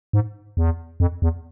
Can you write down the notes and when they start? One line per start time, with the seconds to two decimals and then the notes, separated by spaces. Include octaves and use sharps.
0.13 G#2
0.57 E2
1.00 F2
1.22 E2